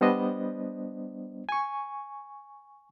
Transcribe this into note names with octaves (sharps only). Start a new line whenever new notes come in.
G3 B3 D4 C5 D#5
G#5 C#6